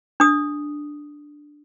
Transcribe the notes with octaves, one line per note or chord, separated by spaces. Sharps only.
D4 D#6